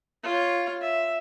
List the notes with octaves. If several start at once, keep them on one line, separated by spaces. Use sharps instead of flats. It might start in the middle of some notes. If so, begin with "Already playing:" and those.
F4 C#5
E5